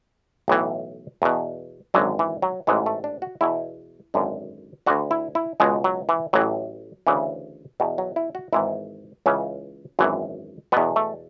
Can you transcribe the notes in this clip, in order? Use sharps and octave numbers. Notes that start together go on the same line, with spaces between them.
B1 A2 E3
E2 B2
G#1 F#2 D3 F#3
E3
F#3
A1 G#2 E3 G#3
A3
D4
F#4
E2 B2 E4
G#1 F#2 D3
D2 D3 F#4
E4
E4
C#2 B2 G#3
F#3
E3
A1 A2 E3 F#3
D2 C#3 E3
E2 B2
F#3
E4
F#4
G#1 G#2 E3 E4
C#2 C#3 E3 C#4
G#1 F#2 E3
E2 B2 B3
A3